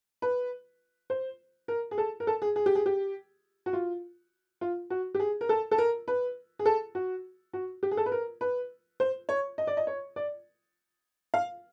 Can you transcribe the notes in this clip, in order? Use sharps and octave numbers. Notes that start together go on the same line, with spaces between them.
B4
C5
A#4
G#4
A4
A#4
A4
G#4
G#4
G4
G#4
G4
F#4
F4
F4
F#4
G4
G#4
A#4
A4
A4
A#4
B4
G#4
A4
F#4
F#4
G4
G#4
A4
B4
A#4
B4
C5
C#5
D#5
D5
D#5
C#5
D5
F5